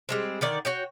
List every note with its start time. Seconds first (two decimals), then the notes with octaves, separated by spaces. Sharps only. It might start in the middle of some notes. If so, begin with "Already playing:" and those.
0.09 G3 G#3 C4
0.41 D3 D#3 D5
0.65 F#4 C#5 G5